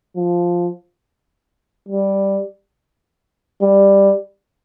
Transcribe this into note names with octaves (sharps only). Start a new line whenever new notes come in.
F3
G3
G3